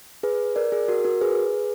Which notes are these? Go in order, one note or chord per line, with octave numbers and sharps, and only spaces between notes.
G#4 B4
A#4 D5
G#4
F#4 A#4
F#4 A#4
G#4 B4